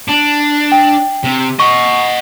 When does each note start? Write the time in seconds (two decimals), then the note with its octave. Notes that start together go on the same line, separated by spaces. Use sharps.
0.09 D4
0.72 G5
1.24 C3
1.60 D#5 F#5 C#6